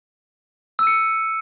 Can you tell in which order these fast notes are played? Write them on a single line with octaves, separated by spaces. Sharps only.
E6 D#7 C#7